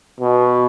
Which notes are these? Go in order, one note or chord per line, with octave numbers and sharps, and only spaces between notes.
B2